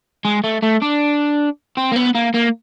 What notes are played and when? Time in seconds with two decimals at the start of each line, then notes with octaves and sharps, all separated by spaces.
0.25 G#3
0.44 A3
0.63 A3
0.82 D4
1.77 C4
1.92 A#3
1.96 B3
2.15 A#3
2.34 A#3